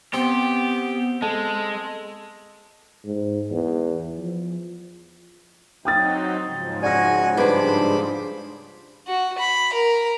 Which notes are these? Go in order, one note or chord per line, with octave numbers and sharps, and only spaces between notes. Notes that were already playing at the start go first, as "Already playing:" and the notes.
B3 C4 G4
G#3 A4
G#2
E2
F3
F#3 C4 D#4 G5 D#6 A6
G#2 C#3 F3
F#4 D5 G#5 A#6
G2 D4 C5 B5 D6
F#4
B5
A#4